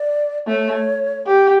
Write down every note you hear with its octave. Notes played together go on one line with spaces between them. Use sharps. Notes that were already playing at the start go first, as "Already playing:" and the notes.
Already playing: D5
A3 C#5
G4